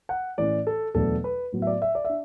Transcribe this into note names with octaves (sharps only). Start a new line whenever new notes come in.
F#5
A2 E3 A3 C#4 D5
A4
E2 B2 F#3 A3 D4 A4
B4
A2 F#3 B3
E5
D5
E5
D5
E5
D4